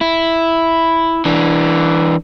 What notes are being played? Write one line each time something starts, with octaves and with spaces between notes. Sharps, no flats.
E4
E3 D4